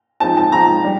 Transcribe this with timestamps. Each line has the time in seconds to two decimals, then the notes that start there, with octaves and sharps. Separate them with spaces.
0.20 F3 G#3 C4 D#4 A5
0.37 A5
0.52 F3 G#3 C4 D#4 A#5
0.84 G3 D4